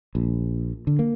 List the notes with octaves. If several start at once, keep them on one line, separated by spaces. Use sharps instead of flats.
A#1
D3
A#3